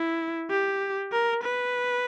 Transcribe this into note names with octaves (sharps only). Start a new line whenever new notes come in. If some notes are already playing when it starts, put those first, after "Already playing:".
Already playing: E4
G4
A#4
B4